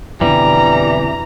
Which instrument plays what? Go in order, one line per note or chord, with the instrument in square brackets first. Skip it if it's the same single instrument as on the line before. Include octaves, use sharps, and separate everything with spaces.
[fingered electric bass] F2 B2 D3 [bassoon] E3 [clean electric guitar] G3 [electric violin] A#5